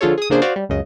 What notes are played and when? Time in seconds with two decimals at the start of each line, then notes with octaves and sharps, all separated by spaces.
0.01 D3 F3 F4 G#4 A4 C#5
0.18 G#4 D#6
0.30 C#3 F3 A#3 D4 G#4 C5
0.42 F#4 C5 D5 F5
0.56 G3
0.69 C#2 F#2 C#3 D#5